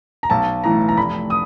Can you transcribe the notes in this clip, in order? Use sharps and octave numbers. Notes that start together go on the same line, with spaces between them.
A#5
B1 A5
A2 E3 A#5
A#5
F1 B5
D#6